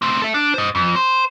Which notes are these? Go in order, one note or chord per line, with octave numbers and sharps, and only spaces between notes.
A3 C4
A4 E5
D4
C5 D#5
F2
C5